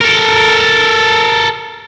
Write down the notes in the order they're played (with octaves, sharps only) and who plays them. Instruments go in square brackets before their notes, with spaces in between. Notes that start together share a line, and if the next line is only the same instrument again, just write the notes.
[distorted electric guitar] A4 A#4